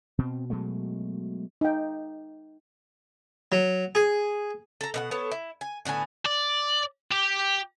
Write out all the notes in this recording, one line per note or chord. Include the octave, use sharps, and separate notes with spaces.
B2 C4
B2 F#3 G#3 A3
D#4 G5
F#3
G#4
A4 A#5
B2 A#4 F#5
B3 A4 C#5
E4
G#5
A2 D3 B3 G#5
D5
G4